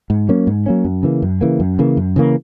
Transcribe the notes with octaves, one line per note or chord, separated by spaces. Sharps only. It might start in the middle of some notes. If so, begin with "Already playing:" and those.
G#2
F#3 A#3 C#4
G#2
F#3 A#3 C#4
F#2
C#3 E3 A#3
F#2
C#3 E3 A#3
F#2
C#3 E3 A#3
F#2
C#3 E3 A#3